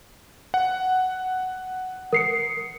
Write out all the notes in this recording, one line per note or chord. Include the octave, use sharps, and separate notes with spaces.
F#5
A#4 C7 C#7